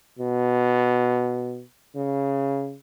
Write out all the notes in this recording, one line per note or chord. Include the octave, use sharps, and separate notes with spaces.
B2
C#3